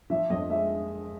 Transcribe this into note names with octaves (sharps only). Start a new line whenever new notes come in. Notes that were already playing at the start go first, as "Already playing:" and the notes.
F3 E5
F2 D#5
G#3 E5